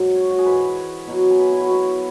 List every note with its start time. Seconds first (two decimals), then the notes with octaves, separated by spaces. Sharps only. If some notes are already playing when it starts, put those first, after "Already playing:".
Already playing: G#2 F#3
0.15 C#5
0.30 F#4
0.38 G#4
0.46 G#2 E3 B4
1.08 B2 F#3
1.30 G#4
1.39 B4
1.52 E4
1.60 F#4
1.70 B2 F#3